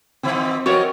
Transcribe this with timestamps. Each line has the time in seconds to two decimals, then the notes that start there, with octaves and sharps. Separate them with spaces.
0.23 G#2 D#3 F3 C4
0.66 E3 G#3 F#4 A#4 C#5